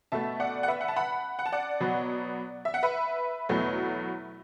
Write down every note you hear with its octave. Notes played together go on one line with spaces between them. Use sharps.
B2 A3 E5 A5
D5 F#5
F#5
B4 E5
F#5
A5
F#5 B5
F#5
A5
D5 F#5
B2 F#3 B3
E5
F#5
B4 E5
E2 B2 F#3 A3